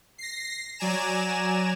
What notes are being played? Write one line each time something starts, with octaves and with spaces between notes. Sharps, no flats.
A#6 C7
F#3 D5 G#5 A#5 E7